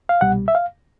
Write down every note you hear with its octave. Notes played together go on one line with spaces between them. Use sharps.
F5
C2 B2 G3 F#5
E5
F5